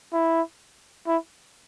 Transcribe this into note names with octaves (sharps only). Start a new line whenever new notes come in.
E4
E4